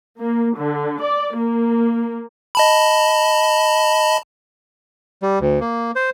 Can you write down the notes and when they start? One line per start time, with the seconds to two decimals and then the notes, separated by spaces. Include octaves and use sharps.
0.18 A#3
0.56 D3
1.01 D5
1.35 A#3
2.55 D#5 A5 B5
5.23 G3
5.40 D2
5.60 A#3
5.96 C5